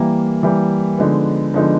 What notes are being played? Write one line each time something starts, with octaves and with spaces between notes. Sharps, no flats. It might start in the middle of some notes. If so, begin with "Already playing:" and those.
Already playing: E3 G3 A#3
E3 G3 A#3
D3 F3 G#3 B3 D#4
D3 F3 G#3 B3 D#4